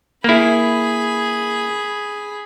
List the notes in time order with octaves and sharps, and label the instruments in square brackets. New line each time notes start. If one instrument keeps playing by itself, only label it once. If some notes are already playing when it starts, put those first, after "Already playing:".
[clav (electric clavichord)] A#3 E4 [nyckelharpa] G#4 B5